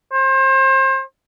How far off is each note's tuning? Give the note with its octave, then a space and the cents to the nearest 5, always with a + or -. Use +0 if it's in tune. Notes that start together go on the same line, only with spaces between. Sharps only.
C5 +35